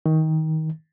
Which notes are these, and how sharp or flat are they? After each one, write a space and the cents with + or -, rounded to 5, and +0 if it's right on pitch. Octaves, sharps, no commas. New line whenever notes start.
D#3 +20